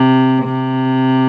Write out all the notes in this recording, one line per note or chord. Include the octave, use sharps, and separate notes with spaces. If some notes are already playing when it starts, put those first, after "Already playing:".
Already playing: C3
C3